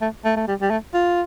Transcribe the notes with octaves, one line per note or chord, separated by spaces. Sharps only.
A3
A3
A3
G3
G3
A3
F4